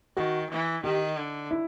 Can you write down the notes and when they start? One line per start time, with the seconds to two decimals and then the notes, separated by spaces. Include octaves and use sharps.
0.16 D#3 F#4
0.50 E3
0.83 D#3 G4
1.17 D3
1.51 E4